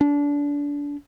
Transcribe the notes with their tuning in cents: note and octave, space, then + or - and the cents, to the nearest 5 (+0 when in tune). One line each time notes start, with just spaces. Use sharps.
D4 -25